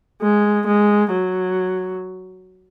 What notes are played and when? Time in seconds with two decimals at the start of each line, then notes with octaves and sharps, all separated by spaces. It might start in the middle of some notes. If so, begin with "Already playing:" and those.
0.22 G#3
0.67 G#3
1.12 F#3